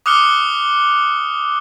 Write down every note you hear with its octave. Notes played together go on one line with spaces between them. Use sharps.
D6 D#6 F6 F#6 C#7 G7